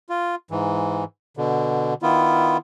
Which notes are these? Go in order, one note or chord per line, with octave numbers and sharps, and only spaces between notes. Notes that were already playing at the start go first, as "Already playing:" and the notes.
F4
G#2 E3
B2 D3
D#3 B3 E4 F4